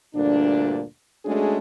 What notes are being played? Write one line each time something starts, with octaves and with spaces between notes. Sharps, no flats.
D2 G2 A#2 D4
G#3 A3 C#4 D4 F#4 G#4